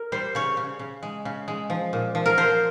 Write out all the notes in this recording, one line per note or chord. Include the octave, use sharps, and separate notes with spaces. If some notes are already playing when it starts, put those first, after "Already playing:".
Already playing: A#4
G3 C5
C#3 C#5
C#3
C#3
G#3
C#3
G#3
F3
A#2
F3
A#4
F3 C5